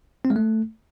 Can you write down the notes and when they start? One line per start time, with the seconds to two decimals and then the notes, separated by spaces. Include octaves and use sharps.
0.25 C4
0.30 G#3
0.36 A3